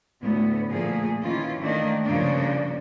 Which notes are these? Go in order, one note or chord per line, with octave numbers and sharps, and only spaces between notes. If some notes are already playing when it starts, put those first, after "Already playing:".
D2 A2 B3
A#2 F3 A3 A#3 G#4
D#3 E3 C#4 F4
D#3 A3 A#3 D4
G2 C#3 F3 A#3 D4